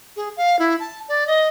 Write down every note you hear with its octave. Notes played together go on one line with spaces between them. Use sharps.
G#4
F5
E4
A5
D5
D#5